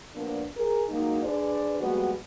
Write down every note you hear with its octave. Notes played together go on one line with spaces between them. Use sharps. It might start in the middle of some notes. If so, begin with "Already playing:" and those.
A#2 F3 A#3 B3 D4
G#4 A#4
F#3 G#3 A#3 D#4
D4 G#4 B4 C5 D5
F3 G3 G#3 A#3 B3 F#4